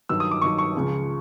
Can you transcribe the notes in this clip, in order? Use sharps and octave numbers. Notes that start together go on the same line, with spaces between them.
G2 D#3 F#3 E6
D#6
D6
G2 D#3 F#3 C#6
C#6
C#2 C#3 F3